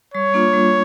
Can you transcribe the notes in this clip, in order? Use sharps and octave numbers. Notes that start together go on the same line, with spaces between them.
G3 C#5
A#3 D4 F4
G3